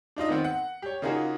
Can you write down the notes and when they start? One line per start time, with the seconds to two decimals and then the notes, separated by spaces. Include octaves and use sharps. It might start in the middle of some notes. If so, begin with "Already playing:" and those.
0.16 D4 D#4 F4 D#5
0.29 D#3 B3 C4
0.44 F#5
0.82 G4 C#5
1.02 C#3 A#3 D#4 F4 F#4 G#4